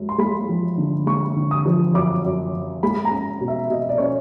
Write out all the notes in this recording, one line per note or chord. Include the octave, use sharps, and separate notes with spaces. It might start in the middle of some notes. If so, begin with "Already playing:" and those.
Already playing: F#2 G#3
C6
G#3 B5
F3
D3
G#3 C#6
D3
D#6
F3
F#2 D6
F#2
F#2
G#3 B5
A#5
C#4
B2
E5
B2 D#5
D5
C#4 C#5